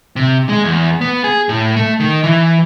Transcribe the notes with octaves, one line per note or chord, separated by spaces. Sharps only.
C3
G#3
E2
B3
G#4
A2
A3
D#3
E3